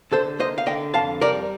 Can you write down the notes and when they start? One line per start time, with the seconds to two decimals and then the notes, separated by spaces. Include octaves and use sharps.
0.12 D3 A4 C5
0.39 A#3 C5 D#5
0.58 F5
0.66 D3 D#5 G5
0.94 F2 F5 A5
1.21 G3 A#4 D5